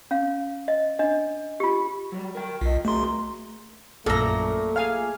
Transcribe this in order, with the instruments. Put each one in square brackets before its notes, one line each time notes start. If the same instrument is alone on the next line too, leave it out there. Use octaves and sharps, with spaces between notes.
[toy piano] C#4 F5
D#5
D4 D#5
F4 G4
[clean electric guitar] F#3 G3
A#4 G5
[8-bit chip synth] B1 [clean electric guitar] F4 D#5
[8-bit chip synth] A3 C6 [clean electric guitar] F#4 G#4 A#4
[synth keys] A#1 F#2 [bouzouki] A#2 A#5 [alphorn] A3 [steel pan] A4
[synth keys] G#4 G#5 F6 [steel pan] F5